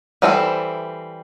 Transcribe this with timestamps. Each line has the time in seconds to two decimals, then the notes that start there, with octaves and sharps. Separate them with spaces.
0.22 E3 G3 C4 D#4 A4